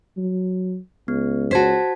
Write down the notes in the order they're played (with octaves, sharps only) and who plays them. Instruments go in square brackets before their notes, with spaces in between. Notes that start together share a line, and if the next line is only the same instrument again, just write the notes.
[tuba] F#3
[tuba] C#2 [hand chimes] B3
[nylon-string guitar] F#4 C5 [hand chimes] A5 G#6 B6